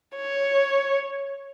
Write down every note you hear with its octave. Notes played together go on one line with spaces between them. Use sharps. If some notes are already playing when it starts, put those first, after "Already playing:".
C#5